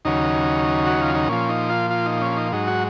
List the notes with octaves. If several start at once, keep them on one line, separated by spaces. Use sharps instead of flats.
D#2 C#3 F#3 D#4
F#4
F4
D#4
A#2 F3 C#4
D#4
F4
F4
D#4
C#4
D#4
G#2 F#3 D#4
F#4